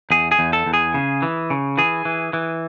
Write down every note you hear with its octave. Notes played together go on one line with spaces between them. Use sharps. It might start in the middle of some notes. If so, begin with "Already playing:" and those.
E2 G#4
G#4
E2
A4
E2
G#4
C#3
E3
C#3
E3 G#4
E3
E3